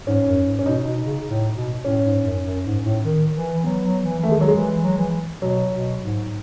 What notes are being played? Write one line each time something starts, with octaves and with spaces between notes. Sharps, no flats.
G#2 C#4
F#2
G#2
C#4
B2 D#4
B2
C#3
A2
B2
A2 C#4
G#2
F#2
F#2
G#2
A2
D#3
E3
F#3 B3
F#3
E3
D#3 A3
G#3
F#3
G#3
E3
F#3
E3
B2 F#3
B2
G#2